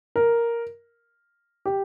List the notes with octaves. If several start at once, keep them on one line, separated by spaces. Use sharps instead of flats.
A#4
G4